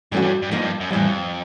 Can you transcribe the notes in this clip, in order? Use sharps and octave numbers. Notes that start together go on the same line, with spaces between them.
G2 E3 A3 C#4 F#4
G2
G2
G#2 F3 A#3 D#4
G2
F#2
F2 A2 E3 G3